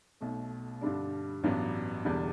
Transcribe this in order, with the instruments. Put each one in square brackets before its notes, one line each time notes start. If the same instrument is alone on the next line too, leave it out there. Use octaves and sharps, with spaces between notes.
[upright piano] B1 B2 A3
G2 D3 G3 D4
A1 G2 F#3 B3 D4
E1 E2 D3 G3 D4